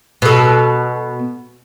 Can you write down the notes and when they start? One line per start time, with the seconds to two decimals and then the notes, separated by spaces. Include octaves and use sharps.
0.22 B2 A4